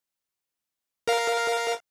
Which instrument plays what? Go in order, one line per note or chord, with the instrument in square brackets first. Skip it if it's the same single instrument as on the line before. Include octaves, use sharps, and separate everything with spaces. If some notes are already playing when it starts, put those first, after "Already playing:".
[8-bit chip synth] A#4 F5